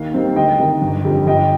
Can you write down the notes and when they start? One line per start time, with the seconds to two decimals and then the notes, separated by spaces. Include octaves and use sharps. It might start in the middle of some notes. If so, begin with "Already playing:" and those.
Already playing: D#2 F5
0.14 D#3 G3 C4
0.36 D2 D#5 G5
0.59 C3 D#3
0.82 G1
1.05 F2 D3 G3
1.27 G1 D#5 G5